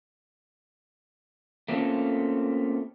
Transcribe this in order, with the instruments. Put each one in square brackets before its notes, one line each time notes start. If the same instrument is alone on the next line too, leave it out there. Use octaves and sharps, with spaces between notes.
[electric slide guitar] A3 A#3 C4 C#4 F4 A4